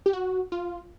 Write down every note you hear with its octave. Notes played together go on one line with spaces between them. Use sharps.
G4
F#4
F4